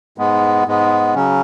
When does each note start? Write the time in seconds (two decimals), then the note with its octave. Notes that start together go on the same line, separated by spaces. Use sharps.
0.18 G#2 G#3 B3
0.66 G#2 G#3 B3
1.14 C#3 F#3 C#4